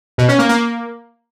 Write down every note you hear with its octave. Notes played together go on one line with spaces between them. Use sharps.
B2
C#4
A#3
A#3